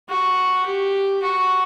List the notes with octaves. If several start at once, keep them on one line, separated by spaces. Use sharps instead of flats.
F#4
G4
F#4